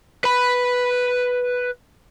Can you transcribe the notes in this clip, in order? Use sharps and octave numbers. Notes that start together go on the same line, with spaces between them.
B4 B5